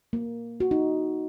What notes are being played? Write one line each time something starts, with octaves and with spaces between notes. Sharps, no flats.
A#3
F#4
D#4